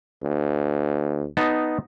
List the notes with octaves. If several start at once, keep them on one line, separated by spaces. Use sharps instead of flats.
D2
B3 D#4 A5